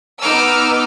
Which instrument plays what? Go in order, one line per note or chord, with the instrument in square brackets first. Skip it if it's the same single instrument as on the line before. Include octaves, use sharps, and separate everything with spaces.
[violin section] B3 D#4 D6 E6 F6